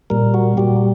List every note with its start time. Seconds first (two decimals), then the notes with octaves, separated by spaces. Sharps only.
0.10 A#2 G3 A#4
0.34 F#4
0.57 A#2 G3 G4